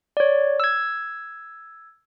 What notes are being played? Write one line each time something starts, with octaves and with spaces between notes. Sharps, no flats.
C#5 D5
E6 G#6